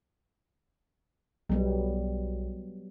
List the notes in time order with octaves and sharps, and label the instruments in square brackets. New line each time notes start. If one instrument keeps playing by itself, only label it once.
[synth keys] B1 [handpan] F#3 G3 B3